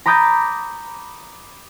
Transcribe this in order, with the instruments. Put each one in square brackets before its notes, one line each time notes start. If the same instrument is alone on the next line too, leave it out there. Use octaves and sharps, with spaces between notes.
[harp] A#5 B5 D6 D#6 G6 A6